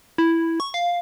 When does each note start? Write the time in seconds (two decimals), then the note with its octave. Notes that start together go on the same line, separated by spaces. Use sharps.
0.18 E4
0.60 C#6
0.74 F5